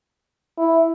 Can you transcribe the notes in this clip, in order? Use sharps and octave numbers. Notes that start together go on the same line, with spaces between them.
E4